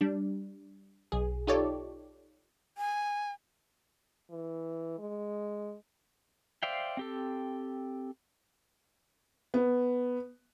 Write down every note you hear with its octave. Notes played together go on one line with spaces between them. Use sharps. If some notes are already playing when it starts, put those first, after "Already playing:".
G3 D4
B1 G#4
D#4 F4 G4 A4 C#5 D5
G#5
E3
G#3
C5 D5 E5 F5 G5
C4 G4 A4
B3